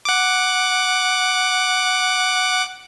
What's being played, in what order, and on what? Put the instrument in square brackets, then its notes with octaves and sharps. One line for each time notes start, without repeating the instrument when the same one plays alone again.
[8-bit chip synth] F#5 D6